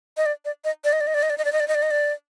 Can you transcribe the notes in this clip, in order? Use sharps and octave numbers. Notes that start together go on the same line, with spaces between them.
D#5
D5
D5
D#5
D5
D#5
D5
D#5
D5
D#5
D5
D#5
D5
D#5
D5
D#5
D5
D#5
D5